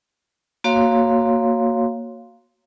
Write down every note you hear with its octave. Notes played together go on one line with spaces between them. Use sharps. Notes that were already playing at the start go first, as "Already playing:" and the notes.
A#3 F#4 C#5 F5 C6